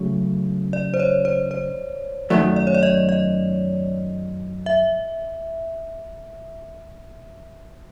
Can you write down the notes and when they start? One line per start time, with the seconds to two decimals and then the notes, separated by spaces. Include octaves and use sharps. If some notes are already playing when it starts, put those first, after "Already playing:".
Already playing: C#3 F#3 A3
0.73 D5
0.94 C5
1.00 C#5
1.25 C5
1.51 C5
2.30 F#2 D#3 F#3 A3 D5
2.56 D5
2.67 C#5
2.74 D5
2.83 D#5
3.09 D#5
4.66 E5